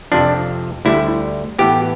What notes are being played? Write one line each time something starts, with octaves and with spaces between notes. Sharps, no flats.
F2 C3 F3 D4
D2 D3 G3 E4
A2 E3 B3 G4